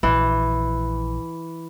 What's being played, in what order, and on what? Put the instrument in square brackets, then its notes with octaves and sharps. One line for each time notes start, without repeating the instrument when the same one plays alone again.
[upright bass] A#1 [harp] E3